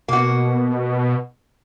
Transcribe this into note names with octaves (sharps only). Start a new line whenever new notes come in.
B2 A#3 F#4